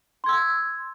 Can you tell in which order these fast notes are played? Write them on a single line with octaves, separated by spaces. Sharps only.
C6 G#6 E6